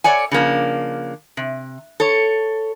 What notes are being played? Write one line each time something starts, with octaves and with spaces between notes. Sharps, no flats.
A4 C#5 D5 F#5 G#5
C#3 F3 A#3 D4
C3
A4 C#5